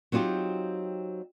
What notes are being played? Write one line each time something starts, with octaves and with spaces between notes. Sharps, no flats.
F#3 C4 D#4 F4 G4